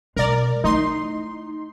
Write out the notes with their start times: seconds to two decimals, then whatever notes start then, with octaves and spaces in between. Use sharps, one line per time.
0.16 B2 G#3 A#4 D5
0.64 A3 D#4 E4 C6